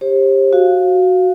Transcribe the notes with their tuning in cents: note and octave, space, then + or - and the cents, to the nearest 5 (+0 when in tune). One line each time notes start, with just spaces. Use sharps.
G4 +15 C5 +40
F#4 +0 F5 +0